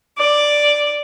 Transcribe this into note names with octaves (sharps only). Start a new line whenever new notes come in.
D5